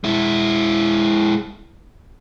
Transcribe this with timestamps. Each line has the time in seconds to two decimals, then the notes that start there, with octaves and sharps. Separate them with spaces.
0.04 G#3 E4